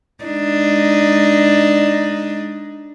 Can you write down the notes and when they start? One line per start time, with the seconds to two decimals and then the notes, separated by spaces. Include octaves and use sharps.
0.24 G#3 D4 D#4